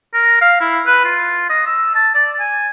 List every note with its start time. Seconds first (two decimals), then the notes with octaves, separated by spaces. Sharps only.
0.14 A#4
0.41 F5
0.61 E4
0.86 B4
1.05 F4
1.50 D#5
1.67 E6
1.95 A5
2.15 D5
2.40 G#5